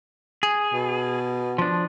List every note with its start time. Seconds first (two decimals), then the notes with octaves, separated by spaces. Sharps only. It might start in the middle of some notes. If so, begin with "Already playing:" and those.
0.43 G#4
0.73 B2
1.58 F3 D4